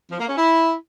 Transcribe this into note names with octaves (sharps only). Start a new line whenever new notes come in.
F3
A#3
C#4
E4